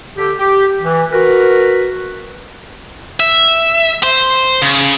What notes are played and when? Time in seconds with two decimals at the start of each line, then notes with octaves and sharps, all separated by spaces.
0.16 D3 G4
0.38 G4
0.82 E3
1.11 F#4 A#4 B4
3.20 E5
4.03 C5
4.62 C#3